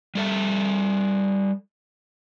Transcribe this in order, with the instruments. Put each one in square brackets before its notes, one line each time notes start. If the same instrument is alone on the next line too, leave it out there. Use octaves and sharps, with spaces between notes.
[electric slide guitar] G3 A4 E5